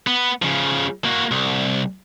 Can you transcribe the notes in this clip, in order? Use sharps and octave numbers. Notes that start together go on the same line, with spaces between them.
B3
C#3 F3
A#3 F#4
C2